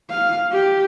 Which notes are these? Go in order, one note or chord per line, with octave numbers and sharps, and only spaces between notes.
F5
G4